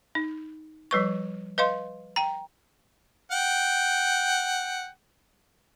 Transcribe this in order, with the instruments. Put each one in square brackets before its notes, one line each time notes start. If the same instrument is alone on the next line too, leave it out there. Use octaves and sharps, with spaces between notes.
[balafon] D#4
F3 G3 B4 C#6
B4 D#5 F5 C6
G5 A#5
[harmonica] F#5 G5